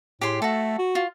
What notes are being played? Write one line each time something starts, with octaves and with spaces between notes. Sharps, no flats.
A2 G4 G#4 C6
A3 F#4 A4
F#4
F4